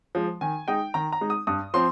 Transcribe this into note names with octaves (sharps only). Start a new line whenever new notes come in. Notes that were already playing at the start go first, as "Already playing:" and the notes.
F3 G#3
D#3 G#5
G#3 D#4 G5
D#3 A#5
A#5
G#3 D#4
D#6
G2 D#6
F3 C4 C6